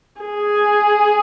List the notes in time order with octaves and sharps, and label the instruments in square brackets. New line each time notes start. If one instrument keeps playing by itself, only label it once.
[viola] G#4